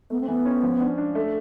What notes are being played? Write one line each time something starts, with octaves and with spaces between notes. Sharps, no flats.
A3 B3
C4
E3 B3
C#4
F3
D4
D4
A3